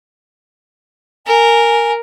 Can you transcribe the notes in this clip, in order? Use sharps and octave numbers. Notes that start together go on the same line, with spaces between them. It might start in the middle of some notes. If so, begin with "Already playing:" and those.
A#4 G#5